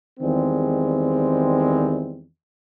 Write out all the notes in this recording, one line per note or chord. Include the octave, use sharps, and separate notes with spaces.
E2 D#3 G3 G#3 C4